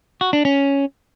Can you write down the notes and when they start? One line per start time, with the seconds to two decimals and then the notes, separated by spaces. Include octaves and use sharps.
0.21 F#4
0.33 D4
0.45 C#4